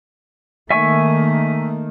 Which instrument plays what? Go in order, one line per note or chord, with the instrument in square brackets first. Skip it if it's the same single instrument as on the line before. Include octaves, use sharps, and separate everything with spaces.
[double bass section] D#3 [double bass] A3 A#3 [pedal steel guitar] E5 G#5 C#6